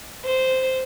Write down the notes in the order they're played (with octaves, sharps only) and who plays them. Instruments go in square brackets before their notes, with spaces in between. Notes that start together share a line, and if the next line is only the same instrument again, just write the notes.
[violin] C5